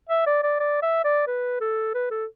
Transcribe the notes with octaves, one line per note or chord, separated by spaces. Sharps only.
E5
D5
D5
D5
E5
D5
B4
A4
B4
A4